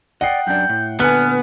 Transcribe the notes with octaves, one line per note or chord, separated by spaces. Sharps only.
D5 D#5 F#5 G5 C7
F#2 D4 G6
A2
A#2 D3 B3 B4 G#5 F6 F#6